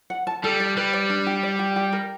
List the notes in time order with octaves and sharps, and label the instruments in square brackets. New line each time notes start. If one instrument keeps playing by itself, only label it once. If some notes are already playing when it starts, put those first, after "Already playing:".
[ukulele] F#5
A5
[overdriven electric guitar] G3 [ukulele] A4
[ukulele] D5
[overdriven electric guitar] G3 [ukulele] B4
[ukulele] D5
D4
G4
D5
G4
G4
A#4